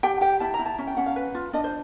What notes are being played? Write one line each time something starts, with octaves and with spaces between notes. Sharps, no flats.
G4 G5
G4 G5
E4 A5
A#5
E4
A5
C#4
G5
C#4 F#5
F5
B4
F4
D4 D#5
C5